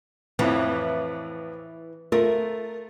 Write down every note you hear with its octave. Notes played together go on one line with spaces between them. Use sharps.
F2 A2 E3
A3 F4 A#4